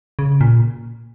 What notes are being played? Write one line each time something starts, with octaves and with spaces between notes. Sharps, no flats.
C#3
A#2